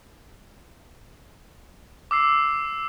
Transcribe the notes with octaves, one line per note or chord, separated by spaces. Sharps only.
D6 E6 C7